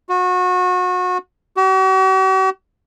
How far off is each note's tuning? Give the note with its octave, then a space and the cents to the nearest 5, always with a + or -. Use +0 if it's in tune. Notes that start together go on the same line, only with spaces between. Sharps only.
F#4 -30
F#4 +45